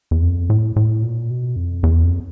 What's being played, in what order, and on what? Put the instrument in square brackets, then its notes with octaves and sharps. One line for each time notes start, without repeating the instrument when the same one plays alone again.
[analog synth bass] E2
F2
A2
A2
A#2
B2
F2
E2
F2